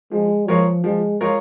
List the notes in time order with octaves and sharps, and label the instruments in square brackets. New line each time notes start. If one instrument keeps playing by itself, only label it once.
[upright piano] F3 [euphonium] G#3
[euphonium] F3 [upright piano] G#3 F4 A#4 C#5
[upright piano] F3 [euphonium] G#3
[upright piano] G#3 F4 A#4 C#5